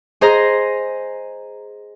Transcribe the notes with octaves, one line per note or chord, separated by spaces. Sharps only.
G#4 C5 D#5 A#5